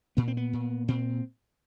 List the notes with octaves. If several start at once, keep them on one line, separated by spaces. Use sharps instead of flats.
A#2 B3
C4
B3
A#2
A#2 C4